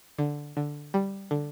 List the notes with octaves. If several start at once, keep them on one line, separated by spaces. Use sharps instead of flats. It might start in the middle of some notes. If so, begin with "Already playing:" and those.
D3
D3
G3
D3